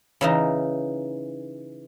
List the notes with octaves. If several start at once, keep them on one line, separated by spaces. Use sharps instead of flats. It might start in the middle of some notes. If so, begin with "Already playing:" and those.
C#3 E3 D#4